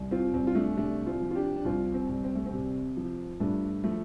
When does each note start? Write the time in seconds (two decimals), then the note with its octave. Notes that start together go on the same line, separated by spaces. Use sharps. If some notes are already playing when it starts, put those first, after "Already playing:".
Already playing: C2
0.11 C4 F4
0.33 C2 C4
0.47 F4
0.55 A3 D4
0.77 C3 A3 D4
1.06 C4 F4
1.21 F3
1.31 F4
1.35 D4 G4
1.56 D4
1.65 C2 C4 F4
1.94 C4
2.09 C2
2.24 C4
2.35 A3
2.46 C4
2.53 C3
2.97 F3
3.40 G2 A3 D4
3.84 F3 A3